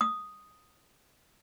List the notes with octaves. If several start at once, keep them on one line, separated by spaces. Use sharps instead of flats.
D#6